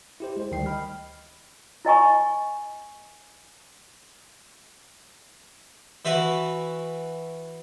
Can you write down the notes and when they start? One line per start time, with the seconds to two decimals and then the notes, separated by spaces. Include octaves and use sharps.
0.20 E4 G4 C5
0.37 G#3 C5
0.52 D2 D#3 G3 G5 C7
0.66 D#5 G5 B5 F6
1.85 E4 D#5 G#5 C#6
6.05 E3 E4 F#4 B4